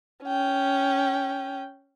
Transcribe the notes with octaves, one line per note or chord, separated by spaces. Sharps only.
C#4 G5